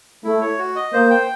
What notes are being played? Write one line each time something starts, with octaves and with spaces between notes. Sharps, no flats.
A3 E4
C#5
F#4
D#5
A#3 C5
G5